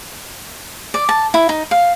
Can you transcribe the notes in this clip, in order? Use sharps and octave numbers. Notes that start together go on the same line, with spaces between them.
D5
A5
E4
D#4
F5